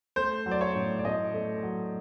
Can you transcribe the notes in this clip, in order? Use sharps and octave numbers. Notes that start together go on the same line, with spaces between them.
A3 C5
F#3
D5
C#5
A2
D5
A2 D#5
A3
F#3